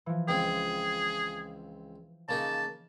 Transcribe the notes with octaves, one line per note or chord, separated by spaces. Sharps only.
E3 F3
C#2 C4 G#4 G5
C#3 A#3 D#4 A5